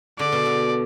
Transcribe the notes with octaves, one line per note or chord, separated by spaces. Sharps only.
D3 D5
B2
D3